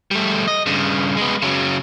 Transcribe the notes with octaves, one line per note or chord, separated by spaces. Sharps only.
G3 A3
D#5
G2 C#3
G#3 B3
C#3 F#3